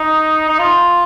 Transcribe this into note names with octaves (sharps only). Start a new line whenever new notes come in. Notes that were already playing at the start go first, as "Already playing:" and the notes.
Already playing: D#4
D#4
F4